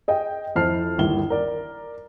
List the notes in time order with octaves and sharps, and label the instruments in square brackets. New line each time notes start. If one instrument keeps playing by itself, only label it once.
[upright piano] G#4 D#5 G5
F2 E4 C5 A5 F6 C7
G1 D#2 E4 G7
A#4 D5